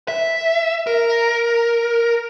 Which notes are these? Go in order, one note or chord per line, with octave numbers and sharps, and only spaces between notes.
E5
A#4